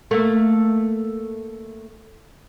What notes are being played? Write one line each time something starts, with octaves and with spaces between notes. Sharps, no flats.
A3 A#3